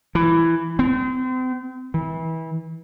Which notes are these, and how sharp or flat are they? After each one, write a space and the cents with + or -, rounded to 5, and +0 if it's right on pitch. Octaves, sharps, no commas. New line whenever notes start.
E3 +10
C4 -35
E3 -30